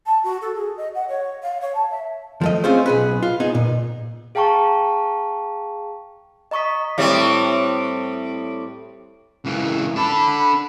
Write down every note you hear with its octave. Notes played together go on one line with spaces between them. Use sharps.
A5
F#4
A4
G#4
D#5
F#5
C#5
F5
C#5
A5
E5
F3 A3 D#5
C4 C#4 F4 G#4 C5
B1 G#4 B4
F4
B3 D#4 G#4
A#2
G#4 F5 G5 A5 A#5 C#6
D#5 A#5 C#6 D#6 B6
A2 G3 C4
C#2 E3
D4 A4 B5